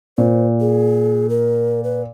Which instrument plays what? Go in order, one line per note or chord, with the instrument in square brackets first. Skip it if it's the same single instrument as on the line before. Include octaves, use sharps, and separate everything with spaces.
[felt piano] A#2 [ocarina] C5
[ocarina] G#4
A#4
B4